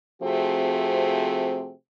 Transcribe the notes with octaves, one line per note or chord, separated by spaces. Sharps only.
C3 F3 A3 C4 F#4 G#4